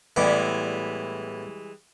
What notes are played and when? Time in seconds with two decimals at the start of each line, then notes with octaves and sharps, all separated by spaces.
0.16 A2 E3 G3 G#3 B3 D6